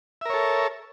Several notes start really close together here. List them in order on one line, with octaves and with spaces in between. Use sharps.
E5 A#4 C#5 A4